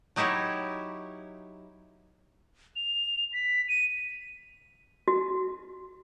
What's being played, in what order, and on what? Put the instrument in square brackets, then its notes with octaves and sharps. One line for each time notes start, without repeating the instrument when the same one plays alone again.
[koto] F#3 D#4 E4 G4 C#5
[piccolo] F7
B6
D#7
[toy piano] F#4